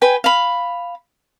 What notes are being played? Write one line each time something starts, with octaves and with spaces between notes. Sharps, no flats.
B4 G5 G#5
F5 B5